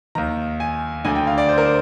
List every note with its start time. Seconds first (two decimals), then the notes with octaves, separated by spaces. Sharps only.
0.15 D#2 D#3 A#5
0.60 G#5
1.05 D2 D3 G#5
1.15 G5
1.27 F5
1.38 D5
1.49 C5
1.58 A#4
1.65 C5